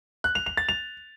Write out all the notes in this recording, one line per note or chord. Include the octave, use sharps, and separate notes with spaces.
F#6
F7
F7
A6
F7